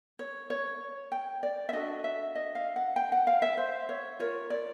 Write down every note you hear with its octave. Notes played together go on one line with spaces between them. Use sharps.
C#5
C#5
G5
D5
E5
D4 F#4 A4 D#5
E5
D#5
F5
F#5
G5
F#5
F5
E5
C5
C#5
F4 A#4 C#5
D5